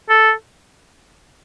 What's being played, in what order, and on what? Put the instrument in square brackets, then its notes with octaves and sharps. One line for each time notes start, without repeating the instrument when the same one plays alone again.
[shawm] A4